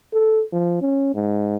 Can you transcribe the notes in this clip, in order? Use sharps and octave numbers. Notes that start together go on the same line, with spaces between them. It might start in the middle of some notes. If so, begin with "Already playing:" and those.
A4
F3
C#4
G#2